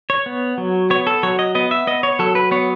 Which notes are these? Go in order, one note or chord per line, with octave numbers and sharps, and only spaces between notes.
C#5
B3
F#3
B3 C#5
A4
F#3 C#5
D#5
B3 D#5
E5
B3 D#5
C#5
F#3 A4
B4
B3 C#5